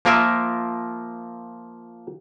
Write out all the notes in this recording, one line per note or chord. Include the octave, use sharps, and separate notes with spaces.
F3 A#3 F4 A#4 E5